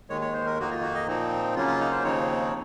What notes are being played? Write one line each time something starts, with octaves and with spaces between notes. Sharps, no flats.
D#2 D#3 G#3 C#5
C#5
C5
A#4
F2 D#3 A#3 D#4 F#4
F4
F#4
D#5
A#2 F3 C4 D#4
C#3 F#3 A#3 C#4 F4
F4
D#4
C5
D#2 C#3 F3 C4 D#4 C#5